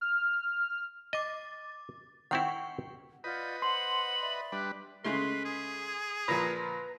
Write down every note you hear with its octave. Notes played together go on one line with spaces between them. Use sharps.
F6
D#5 D6 A6
D#3 C4 E4 F#5 G5 C#6
F4 B4 D5 D#5 F#5 G6
C5 F#5 C6 F#7
D5 E5 B5
G3 D4 B4 F#6
C#3 G#3 A3 B4 C6
G#4
A#2 F3 B4 A#5